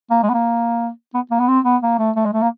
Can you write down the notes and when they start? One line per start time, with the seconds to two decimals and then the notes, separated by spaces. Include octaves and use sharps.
0.10 A#3
0.23 G#3
0.29 B3
0.33 A#3
1.14 B3
1.31 A#3
1.40 B3
1.48 C4
1.65 B3
1.82 A#3
1.98 A3
2.16 A3
2.25 G#3
2.33 A3
2.42 A#3